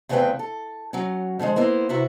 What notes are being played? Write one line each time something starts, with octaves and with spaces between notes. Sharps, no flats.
E2 C#3 A3 C4 B4 G5
A4
F#3 C#4
A2 D3 F3 G#3
A#3 B3 E4 C5
C3 E4 F#4 B4 E5